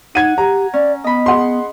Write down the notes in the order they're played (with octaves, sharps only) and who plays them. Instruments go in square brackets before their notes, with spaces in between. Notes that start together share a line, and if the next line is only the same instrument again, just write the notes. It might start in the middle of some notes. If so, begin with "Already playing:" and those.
[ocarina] D#4 [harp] F#5 [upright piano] G#6 D#7
[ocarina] G4 [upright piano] A#5
[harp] C#4 [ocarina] D5
[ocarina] B3 [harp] D#5 B5
[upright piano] G#4 F#5 C6